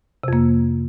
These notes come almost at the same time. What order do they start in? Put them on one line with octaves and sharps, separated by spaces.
C3 F2 A#3